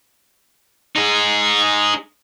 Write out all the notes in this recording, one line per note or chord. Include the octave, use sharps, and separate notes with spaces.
D#4 G#4